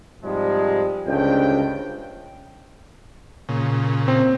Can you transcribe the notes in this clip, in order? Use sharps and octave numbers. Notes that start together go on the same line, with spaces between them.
G#2 C3 F3 G3 G#3
C#2 G2 D3 C5 G5
A#2 C#3
C4